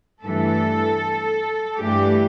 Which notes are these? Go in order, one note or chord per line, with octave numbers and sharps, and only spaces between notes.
G2 E3 A3 A4
G2 E3 A3 G4